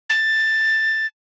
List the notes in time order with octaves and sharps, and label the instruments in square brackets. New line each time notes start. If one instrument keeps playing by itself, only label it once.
[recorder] A6